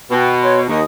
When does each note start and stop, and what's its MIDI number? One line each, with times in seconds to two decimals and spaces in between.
0.11 0.67 47
0.11 0.32 79
0.42 0.60 73
0.42 0.60 84
0.68 0.81 39
0.68 0.83 75
0.68 0.83 87